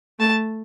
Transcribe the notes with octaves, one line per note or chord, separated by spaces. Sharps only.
A3 A5